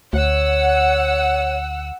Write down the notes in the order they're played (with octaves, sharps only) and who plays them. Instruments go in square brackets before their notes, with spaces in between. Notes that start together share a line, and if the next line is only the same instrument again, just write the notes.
[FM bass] D2 [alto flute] C#5 [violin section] F#5 E6